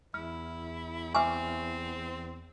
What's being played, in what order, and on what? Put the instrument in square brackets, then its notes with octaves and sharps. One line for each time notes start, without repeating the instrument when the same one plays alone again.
[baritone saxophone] E2 [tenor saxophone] E4 [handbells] F6
[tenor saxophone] C4 [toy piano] E5 G#5 [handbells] C#6 D6 F6